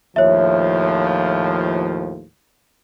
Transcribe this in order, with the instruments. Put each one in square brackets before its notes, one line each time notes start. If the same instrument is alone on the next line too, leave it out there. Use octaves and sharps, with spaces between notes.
[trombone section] D#2 A2 F3 [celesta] C#5 E5